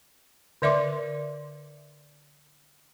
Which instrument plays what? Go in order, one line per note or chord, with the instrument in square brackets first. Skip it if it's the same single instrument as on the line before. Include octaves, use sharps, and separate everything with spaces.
[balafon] D3 A#4 D5 E5 C6 D6